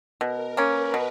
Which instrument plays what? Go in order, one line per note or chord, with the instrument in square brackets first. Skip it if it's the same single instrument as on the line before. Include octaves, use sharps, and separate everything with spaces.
[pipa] B2 [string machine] A#4
[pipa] A#3 C#4 [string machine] B4
[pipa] B2